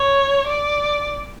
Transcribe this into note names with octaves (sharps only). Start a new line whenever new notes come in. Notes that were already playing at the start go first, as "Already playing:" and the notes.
Already playing: C#5
D5